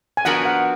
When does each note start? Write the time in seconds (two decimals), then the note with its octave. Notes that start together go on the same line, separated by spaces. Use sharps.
0.17 G#5
0.25 F3 B3 D4 F#4 A#4 F#5
0.46 F#5